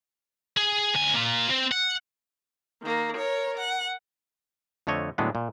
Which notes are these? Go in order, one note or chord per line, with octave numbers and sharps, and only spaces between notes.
G#4
D2 G#5
A#3 F4
C4
F#5
D#3 A#3
A#4 C#5
F#5
F2 D3 A3 C#5 D#5
A2 D3 F#3 G#3 B3
A#2